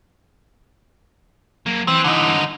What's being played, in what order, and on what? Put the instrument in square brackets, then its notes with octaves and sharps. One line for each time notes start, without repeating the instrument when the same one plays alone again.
[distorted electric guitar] F#3 A#3
[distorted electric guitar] E3 [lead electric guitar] C4
[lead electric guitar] D3 D#4